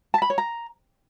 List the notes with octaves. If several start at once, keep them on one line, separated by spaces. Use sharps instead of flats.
A5
B5
C#5
A#5